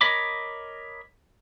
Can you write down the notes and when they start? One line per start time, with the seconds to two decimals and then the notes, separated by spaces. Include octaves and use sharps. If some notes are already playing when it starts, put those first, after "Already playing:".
0.01 A#4 C#5 D#5 B5 D6